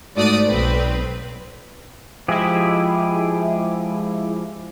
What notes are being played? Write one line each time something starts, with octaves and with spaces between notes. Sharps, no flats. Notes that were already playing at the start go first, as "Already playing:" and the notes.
G#2 A3 F#4 D5 D#6
B1 C4 B4
F3 G#3 E4 G4 G#4